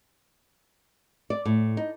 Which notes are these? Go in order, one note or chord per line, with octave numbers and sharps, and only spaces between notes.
D5
A2
D#4